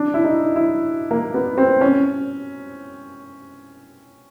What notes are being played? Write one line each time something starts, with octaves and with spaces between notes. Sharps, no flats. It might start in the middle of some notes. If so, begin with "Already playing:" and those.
Already playing: D4
E4
D#4
E4
A#3
B3
C4
C#4